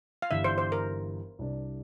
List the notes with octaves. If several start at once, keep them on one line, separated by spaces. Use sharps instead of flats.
F5
G1 G2 E3 G3 E5
C5
C5
A#4
C2 C3 G3 D4